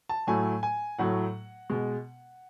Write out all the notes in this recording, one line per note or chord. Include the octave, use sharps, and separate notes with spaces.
A5
A2 F#3 A3 G#5
G#5
A2 F#3 A3 F#5
B2 G#3